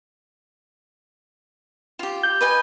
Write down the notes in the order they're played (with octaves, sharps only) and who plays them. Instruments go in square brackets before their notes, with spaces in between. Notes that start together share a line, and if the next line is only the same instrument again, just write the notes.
[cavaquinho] F4 G4
[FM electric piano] G6
[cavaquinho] B4 D#5 G#5